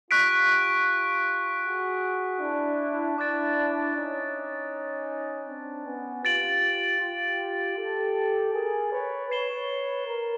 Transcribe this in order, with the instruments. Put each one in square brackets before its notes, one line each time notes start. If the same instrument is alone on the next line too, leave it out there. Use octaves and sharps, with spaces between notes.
[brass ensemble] F4 G4 [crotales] C#6 F#6 B6 D7
[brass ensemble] F#4 G#4
D4 E4
[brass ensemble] D4 E4 [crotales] D6 F#6 A6 D7
[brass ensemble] C#4 D#4
C4 D4
B3 C#4
[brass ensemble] F4 G4 [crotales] A6 D7 F#7
[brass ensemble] F4 G4
G4 A4
G#4 A#4
B4 C#5
[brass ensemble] B4 C#5 [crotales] G#6 C7 E7 G7
[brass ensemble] A#4